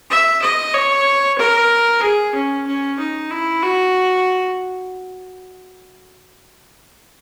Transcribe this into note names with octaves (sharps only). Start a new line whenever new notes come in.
E5
D#5
C#5
A#4
G#4
C#4
C#4
D#4
E4
F#4